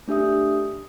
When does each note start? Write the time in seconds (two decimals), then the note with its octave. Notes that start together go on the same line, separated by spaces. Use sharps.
0.08 A3 D4 G4 E5 D#6